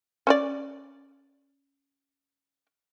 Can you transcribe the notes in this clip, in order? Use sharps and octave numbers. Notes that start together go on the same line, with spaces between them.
C#4 C#5 D5